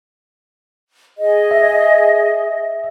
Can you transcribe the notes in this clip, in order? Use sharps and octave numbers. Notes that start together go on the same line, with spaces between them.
G#4 D#5
E5